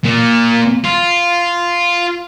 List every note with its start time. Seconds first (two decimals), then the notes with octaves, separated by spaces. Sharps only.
0.05 A#2
0.84 F4